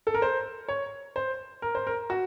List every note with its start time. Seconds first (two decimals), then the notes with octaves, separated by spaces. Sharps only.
0.07 A4
0.14 A#4
0.22 C5
0.68 C#5
1.16 C5
1.62 A#4
1.75 C5
1.87 A#4
2.10 F#4